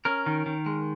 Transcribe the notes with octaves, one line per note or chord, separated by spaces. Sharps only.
C#4 A#4
D#3
D#3
G#3